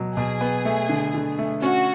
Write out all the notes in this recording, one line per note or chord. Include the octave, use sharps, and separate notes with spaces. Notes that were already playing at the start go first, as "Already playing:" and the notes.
Already playing: B2 F#3
B2 G#4
B3
A3
D3
D3
A3
C#4 F#4